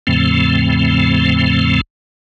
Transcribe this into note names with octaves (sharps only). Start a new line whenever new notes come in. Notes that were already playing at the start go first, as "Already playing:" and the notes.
E2 A2 C#3 F3 A3 C4